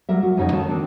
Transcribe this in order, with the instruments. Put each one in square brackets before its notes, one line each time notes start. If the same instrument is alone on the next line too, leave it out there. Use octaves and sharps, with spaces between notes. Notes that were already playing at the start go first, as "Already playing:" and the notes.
[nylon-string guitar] F#3 G3 A#4 E5
F#4
F2 C#3 D#4 F#4 C#5
D#3 A3 A5
D#3 C4 D4